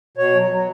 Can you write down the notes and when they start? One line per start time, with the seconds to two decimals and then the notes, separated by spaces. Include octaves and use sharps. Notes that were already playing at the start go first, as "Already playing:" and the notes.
0.17 B2 C#5
0.34 F#3
0.51 F#3